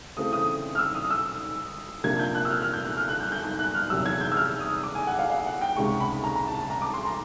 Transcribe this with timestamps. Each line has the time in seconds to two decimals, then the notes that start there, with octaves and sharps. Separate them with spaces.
0.17 C#3 E3 A3 C4 D#6
0.33 D#6
0.75 F6
0.79 E6
0.95 D#6
1.11 E6
2.04 C3 F3 A#3 D4 G#6
2.19 G6
2.35 F#6
2.45 E6
2.50 F6
2.62 F6
2.73 G6
2.85 F#6
2.97 F6
3.08 F#6
3.20 G6
3.32 G6
3.44 G6
3.59 F#6
3.75 F6
3.90 E2 C3 D#3 F#3 E6
4.06 G#6
4.21 G6
4.32 E6
4.37 F6
4.60 D#6
4.84 D6
4.95 G#5
5.07 F#5
5.19 F5
5.30 F5
5.46 F#5
5.61 G5
5.77 C#2 C3 D#3 G#3 C#6
6.00 B5
6.14 B5
6.24 A#5
6.36 A#5
6.47 A5
6.59 A5
6.70 A#5
6.82 D6
6.94 C6
7.05 A#5